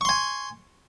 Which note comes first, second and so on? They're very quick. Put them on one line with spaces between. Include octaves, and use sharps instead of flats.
C#6 C6 G#5